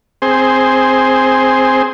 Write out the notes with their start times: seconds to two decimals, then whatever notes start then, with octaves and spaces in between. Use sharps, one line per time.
0.22 C4 G#4 C5